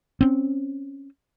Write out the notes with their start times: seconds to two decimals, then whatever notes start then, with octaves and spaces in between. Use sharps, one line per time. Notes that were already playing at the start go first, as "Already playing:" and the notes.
0.21 C4 C#4